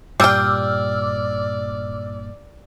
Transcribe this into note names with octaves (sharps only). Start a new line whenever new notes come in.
G2 A#2 G3 D5 G5 D6 E6 F6